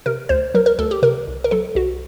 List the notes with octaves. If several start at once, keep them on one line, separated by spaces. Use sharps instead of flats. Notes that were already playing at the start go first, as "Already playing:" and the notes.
C3 A#4
D2 C5
F#3 A#4
A#4
D2 A4
G4
C3 A#4
C2
A#4
F#3 A4
C2 F#4